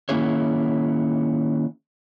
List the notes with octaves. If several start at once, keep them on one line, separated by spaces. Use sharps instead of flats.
D#3 A#3 C#4 E4 G#4 C#5